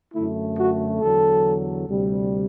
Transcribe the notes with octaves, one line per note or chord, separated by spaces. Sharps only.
F#2 D3 A3 E4
F#4
E2 D3 F#3 A4
D2 C3 G3